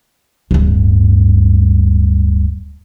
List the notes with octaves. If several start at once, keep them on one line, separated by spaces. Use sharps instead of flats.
D1 G2